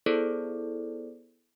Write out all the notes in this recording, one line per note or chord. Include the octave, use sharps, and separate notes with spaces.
B3 E4 G#4 A4 C5 D5